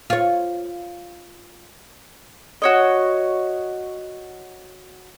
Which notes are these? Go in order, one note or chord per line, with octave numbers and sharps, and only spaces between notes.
F4 C#5
F#4 C#5 D#5